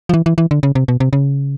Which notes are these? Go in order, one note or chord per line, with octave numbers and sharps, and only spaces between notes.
F3
E3
E3
E3
D3
C#3
C3
B2
C3
C#3